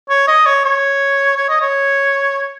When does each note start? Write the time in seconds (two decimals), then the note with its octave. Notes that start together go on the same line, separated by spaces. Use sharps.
0.10 C#5
0.27 D#5
0.46 C#5
0.64 C#5
1.37 C#5
1.49 D#5
1.61 C#5